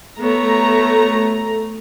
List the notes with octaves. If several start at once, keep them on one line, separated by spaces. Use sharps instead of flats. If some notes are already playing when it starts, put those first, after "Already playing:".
A3 B3 C#5 A#5